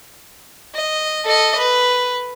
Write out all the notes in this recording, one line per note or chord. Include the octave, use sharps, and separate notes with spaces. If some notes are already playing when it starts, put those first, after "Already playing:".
D#5
A4 D#5
B4